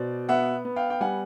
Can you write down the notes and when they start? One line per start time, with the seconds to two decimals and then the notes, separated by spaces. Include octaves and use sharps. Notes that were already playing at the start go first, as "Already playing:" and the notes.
Already playing: B2 C5 D5
0.29 B3 E5 F#5
0.65 B3
0.76 F5 G5
0.90 G5
1.01 G3 F#5 G#5